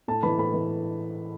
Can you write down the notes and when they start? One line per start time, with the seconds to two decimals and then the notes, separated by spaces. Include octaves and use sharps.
0.08 A2 A5
0.23 E3 B5
0.38 A2 B5
0.54 E3